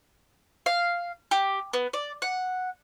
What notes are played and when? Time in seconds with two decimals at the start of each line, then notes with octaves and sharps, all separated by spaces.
0.66 F5
1.31 G4
1.73 B3
1.93 D5
2.22 F#5